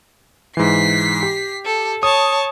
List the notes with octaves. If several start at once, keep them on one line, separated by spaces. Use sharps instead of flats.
G#2 E3 B6 C7
G4
A4
C#5 A5 D#6